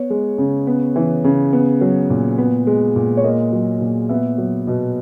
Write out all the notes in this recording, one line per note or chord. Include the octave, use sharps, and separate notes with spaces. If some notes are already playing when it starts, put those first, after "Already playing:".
Already playing: B3 C#5
G#3
C#3
B3
E3
C#3
B3
F#3
A#2
B3
G#3
A#2
C#5
A#3 D#5
F#3
A#2
B3 E5
F#3
B2